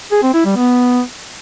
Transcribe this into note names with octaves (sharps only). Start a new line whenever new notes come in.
G#4
C4
E4
G3
B3